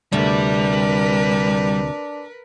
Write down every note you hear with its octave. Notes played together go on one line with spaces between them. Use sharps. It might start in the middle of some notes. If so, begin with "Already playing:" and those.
D2 C3 G3 D4 A#4 B4